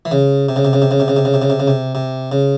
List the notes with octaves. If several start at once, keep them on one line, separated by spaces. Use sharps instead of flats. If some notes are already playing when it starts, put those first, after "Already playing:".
E3
C#3
C3
C#3
C3
C#3
C3
C#3
C3
C#3
C3
C#3
C3
C#3
C3
C#3
C3
C3
C#3